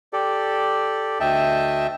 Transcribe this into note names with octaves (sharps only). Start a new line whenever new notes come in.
G4 A4 D5
D2 D#5 E5 G5 A5